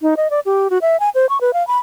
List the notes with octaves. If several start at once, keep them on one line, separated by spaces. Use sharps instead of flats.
D#4
D#5
D5
G4
F#4
E5
G#5
C5
C#6
B4
F5
B5